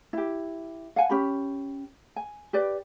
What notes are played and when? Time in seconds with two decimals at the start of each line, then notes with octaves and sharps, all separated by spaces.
0.13 E4 G4
0.96 F5 F#5 G#5
1.10 C#4 G4 B5
2.16 G#5
2.53 G4 B4 D5